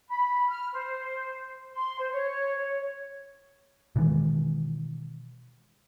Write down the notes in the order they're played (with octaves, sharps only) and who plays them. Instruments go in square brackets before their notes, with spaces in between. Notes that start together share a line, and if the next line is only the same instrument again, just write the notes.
[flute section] B5
F6
C5
C6
C5
C#5
[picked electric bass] B2 D#3 E3 G#3